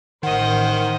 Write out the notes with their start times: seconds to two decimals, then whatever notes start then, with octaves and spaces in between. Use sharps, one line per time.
0.23 A1 A2 D#3 C5 D#5 F#5